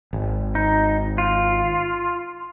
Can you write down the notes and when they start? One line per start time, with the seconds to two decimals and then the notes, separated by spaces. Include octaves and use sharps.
0.13 G#1
0.55 D#4
1.18 F4